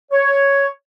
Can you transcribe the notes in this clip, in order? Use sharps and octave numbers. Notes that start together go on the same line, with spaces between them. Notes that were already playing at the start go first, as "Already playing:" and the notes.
C#5